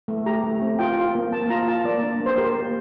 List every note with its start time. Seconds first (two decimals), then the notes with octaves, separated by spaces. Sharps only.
0.08 A3
0.26 G4 A#5
0.43 A3
0.62 C4
0.79 F4 G5
0.97 F4
1.15 A#3
1.32 A#3 A5
1.50 F4 A#5
1.67 F4 A5
1.85 A#3 D5
2.03 D4
2.20 A#3
2.26 C5
2.38 G4 A#4
2.56 A#3